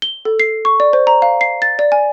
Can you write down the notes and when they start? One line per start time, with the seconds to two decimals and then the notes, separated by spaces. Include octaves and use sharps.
0.02 G7
0.25 A4
0.40 C7
0.65 C#6
0.80 D5
0.93 C5
1.07 A#5
1.22 F5
1.41 C7
1.62 A6
1.79 D5
1.92 G#5